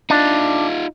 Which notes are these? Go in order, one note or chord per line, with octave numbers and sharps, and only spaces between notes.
D4 D#4 F4